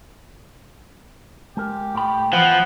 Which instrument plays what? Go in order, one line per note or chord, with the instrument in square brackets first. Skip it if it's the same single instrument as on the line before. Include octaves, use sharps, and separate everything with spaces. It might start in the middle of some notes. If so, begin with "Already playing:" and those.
[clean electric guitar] G#3 A#4 [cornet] G4
[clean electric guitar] A2 G5 B5
[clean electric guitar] E3 [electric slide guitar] F3 [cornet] B3 [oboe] F#5